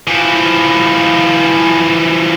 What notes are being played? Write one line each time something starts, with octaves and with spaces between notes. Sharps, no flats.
E3 F3